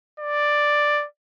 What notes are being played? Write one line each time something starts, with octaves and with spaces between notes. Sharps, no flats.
D5